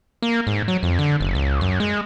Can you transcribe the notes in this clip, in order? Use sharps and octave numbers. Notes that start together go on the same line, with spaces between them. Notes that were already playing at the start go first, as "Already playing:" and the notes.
A#3
G#2
F#3
F2
D3
F#1
C#2
F#2
G#3